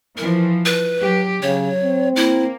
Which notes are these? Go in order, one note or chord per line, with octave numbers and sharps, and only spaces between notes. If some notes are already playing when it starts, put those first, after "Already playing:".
E3 F3 A#4
B4
F#3 G4
C#3 F#3 C#5
C4
A#3 E4